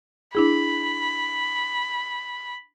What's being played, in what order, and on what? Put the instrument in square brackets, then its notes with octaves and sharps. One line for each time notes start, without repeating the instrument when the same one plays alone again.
[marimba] D4 E4 G#4 [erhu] B5